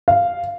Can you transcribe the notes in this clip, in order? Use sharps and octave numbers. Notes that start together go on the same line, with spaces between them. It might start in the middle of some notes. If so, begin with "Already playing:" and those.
F5